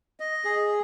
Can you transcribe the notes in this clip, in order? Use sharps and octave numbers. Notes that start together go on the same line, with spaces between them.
D#5
G#4